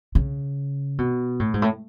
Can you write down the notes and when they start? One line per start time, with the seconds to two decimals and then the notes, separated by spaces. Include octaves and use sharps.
0.15 C#3
0.98 B2
1.40 A2
1.54 G#2
1.62 A2